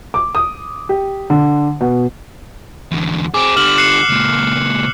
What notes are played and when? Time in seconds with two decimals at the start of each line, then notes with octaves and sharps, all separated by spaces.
0.14 D6
0.35 D#6
0.89 G4
1.30 D3
1.81 B2
2.91 E2 D3
3.34 C4 G#4 D6
3.56 D3 G3 F6 E7 F#7
3.78 F#6 C7 C#7
4.09 C#2 A#2